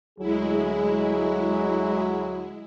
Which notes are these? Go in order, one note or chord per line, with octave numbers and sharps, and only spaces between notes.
D2 F#3 G#3 E4 G#4